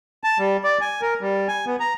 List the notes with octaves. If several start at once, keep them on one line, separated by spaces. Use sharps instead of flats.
A5
G3
D5
G#5
A#4
G3
G#5
B3
A#5